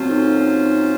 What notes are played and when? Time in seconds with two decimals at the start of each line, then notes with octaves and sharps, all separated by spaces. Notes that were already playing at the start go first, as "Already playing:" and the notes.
Already playing: A#2 F#3 C4 C#4 F4 C5
0.10 D#4